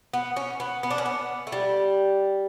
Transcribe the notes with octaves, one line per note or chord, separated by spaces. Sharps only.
B3
C#4
B3
B3
D4
C#4
B3
A3
G3